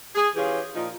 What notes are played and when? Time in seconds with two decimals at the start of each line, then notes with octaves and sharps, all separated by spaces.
0.16 G#4
0.35 E3 C#4 F4 G4 G#4
0.74 A#2 F3 D#4